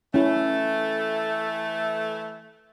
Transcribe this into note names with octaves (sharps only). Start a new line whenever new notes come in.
E3 A3 C#4 E4